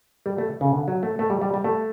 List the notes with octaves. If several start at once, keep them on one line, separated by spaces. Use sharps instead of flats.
G3
A3
C#3
D3
F#3
A3
A3
G3
G3
G3
A3